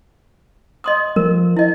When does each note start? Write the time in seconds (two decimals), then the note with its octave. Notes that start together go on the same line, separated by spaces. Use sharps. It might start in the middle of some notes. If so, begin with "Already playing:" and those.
0.84 D#5 C6 D#6
1.16 F3 A#4
1.57 E4 D#5